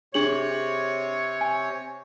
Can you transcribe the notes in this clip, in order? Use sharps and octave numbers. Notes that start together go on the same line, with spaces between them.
C3 D4 G#4 C#5 F#7
G#5